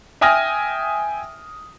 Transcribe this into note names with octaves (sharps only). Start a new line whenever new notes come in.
E5 G5 G#5 D#6 F6 A#6